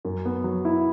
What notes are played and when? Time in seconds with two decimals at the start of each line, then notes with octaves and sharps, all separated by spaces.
0.05 F#2
0.25 B3
0.44 F#3
0.65 E4